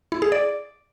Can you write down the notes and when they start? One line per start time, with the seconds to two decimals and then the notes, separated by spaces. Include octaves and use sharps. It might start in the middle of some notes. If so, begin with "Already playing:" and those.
0.12 E4
0.22 G#4
0.32 D5